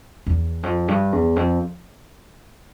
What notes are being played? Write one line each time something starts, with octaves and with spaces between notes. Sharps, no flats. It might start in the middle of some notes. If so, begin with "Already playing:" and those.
E2
F2
G2
E2
F2